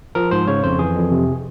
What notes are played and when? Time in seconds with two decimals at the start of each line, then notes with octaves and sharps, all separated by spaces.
0.15 F3 A#4
0.31 G#2 C5
0.48 C#3 C#5
0.64 F2 C5
0.79 E3 G#4
0.96 F2
1.12 C3